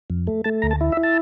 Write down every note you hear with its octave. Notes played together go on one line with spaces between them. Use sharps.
F2
A3
A3 A5
D2 A#5
A5
E4
E5
E4
A5